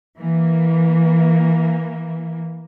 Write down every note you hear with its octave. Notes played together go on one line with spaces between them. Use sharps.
E3 A#3